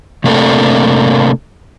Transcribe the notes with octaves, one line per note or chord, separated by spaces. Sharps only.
C3 A3 A#3 C4 D4 A4